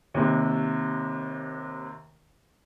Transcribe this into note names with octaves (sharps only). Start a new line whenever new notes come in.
D#2 C3